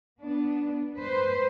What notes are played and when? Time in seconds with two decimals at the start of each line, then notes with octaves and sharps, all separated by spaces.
0.22 B3 D4
0.97 B4 C5